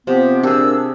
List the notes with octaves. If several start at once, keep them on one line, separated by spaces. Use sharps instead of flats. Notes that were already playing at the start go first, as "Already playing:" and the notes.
C3 F3 B3 G4
A#2 D4 G4 G#4 E6